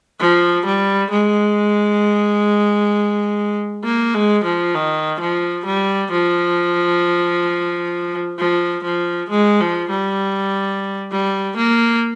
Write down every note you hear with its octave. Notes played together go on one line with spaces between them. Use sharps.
F3
G3
G#3
A#3
G#3
F3
D#3
F3
G3
F3
F3
F3
G#3
F3
G3
G3
A#3